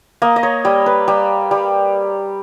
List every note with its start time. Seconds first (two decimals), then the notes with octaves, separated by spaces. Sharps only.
0.22 A#3 D#5
0.36 D#5
0.43 C#5
0.65 G3 D#5
0.86 B4
1.08 G3
1.51 G3